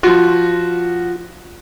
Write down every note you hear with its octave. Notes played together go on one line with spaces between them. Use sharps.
F3 F4 F#4